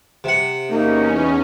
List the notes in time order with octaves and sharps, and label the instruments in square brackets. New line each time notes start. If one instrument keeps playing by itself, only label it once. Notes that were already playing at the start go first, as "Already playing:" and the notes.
[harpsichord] C3 F#5
[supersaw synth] E2 C#4 [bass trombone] A#3 [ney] D#4